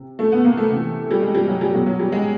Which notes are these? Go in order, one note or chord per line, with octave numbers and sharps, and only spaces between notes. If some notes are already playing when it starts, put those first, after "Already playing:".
Already playing: C3
A3
B3
A#3
A3
C3 E3
G3
G#3
G3
F#3
G3
B2 F#3
F#3
G3
G#3